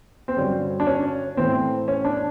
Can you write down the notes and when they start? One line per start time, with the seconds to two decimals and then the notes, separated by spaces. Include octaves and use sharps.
0.28 C4
0.37 G2 D3 F#3 C#4
0.80 D4
0.87 C#4
1.37 A2 E3 A3 C4
1.88 C#4
2.05 D4